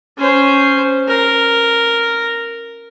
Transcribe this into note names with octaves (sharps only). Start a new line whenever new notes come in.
C#4 C5
A#4